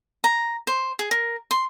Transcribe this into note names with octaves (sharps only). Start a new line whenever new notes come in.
A#5
C5
G#4
A#4
C6